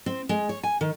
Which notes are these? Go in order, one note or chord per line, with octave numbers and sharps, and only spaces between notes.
C4
G#3
C#5
G#5
D#3